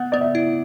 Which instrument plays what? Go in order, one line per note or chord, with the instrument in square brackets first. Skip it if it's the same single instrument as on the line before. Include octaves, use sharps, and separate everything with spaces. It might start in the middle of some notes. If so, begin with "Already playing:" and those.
Already playing: [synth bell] B3 [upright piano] F#5
[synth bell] B3 [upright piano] D5
[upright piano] E5
[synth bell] E4